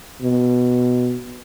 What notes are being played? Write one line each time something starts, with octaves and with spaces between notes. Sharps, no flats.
B2